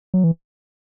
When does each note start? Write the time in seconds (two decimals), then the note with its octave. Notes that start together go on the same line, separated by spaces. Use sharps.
0.14 F#3
0.24 E3